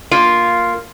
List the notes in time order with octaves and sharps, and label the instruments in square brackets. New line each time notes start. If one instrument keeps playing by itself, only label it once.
[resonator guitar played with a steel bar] A#3 F4